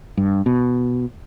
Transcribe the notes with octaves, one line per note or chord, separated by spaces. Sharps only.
G2
B2